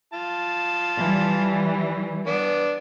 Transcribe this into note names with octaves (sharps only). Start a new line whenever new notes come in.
F4 A5
E3 G3
B3 D4